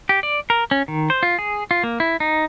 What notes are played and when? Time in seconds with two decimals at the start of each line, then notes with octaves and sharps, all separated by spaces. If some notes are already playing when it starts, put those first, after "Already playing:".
0.09 G4
0.23 D5
0.50 A#4
0.71 C#4
0.88 D#3
1.10 C5
1.23 F4
1.39 G#4
1.71 F4
1.84 A#3
2.00 E4
2.20 D#4